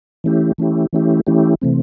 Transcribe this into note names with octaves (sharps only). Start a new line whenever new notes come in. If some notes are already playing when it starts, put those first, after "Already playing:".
E3 A3 C#4 E4 G4
E3 A3 C#4 E4 G4
E3 A3 C#4 E4 G4
E3 A3 C#4 E4 G4
C3 E3 A3 C4